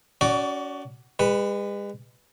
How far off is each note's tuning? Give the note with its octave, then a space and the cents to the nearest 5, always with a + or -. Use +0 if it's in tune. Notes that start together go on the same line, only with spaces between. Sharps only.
C#4 +35 F#4 +20 D5 +0
G#3 -45 B4 +0